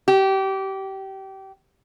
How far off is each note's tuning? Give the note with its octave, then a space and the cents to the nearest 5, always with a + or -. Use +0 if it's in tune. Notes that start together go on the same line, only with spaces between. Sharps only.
G4 -25